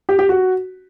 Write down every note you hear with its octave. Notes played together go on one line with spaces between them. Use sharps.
G4
G4
F#4